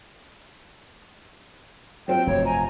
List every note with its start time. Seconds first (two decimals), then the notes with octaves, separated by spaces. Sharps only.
2.08 F#3 C4 F4 G5
2.27 F1 G2 C3 C#5
2.45 G#5 A#5